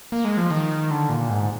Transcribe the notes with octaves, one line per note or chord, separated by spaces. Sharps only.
A#3
G#3
F3
D#3
D3
A#2
G#2